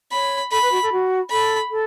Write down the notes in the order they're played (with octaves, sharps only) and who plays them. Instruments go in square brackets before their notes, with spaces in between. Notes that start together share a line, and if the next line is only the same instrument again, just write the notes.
[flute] C#5 [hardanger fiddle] B5
[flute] A4 [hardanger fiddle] B5
[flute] B4
F#4
A4
F#4
[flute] A4 [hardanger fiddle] B5
[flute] A4